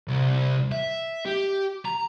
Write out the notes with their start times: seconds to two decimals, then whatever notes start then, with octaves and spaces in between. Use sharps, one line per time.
0.08 C2
0.72 E5
1.25 G4
1.85 A#5